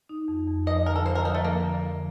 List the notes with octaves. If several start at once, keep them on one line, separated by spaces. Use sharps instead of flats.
D#4
F2
F2
F3 D#5
D3 A#4
A4
F3 C5
A#4
F3 D#4
A3
F3 A#3
D3
F3